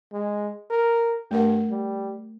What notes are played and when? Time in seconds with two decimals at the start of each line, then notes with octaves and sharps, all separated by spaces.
0.13 G#3
0.70 A#4
1.31 G2 A3 A#4 F#5
1.69 G3